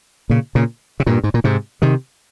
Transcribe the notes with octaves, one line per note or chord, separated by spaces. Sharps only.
A#2 C#3
A#2 C#3
C3
G2 A#2
G#2
A#2
G#2 C3
C3 D#3